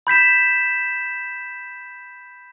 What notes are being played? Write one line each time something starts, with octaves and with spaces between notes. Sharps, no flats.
B5 G6 B6 E7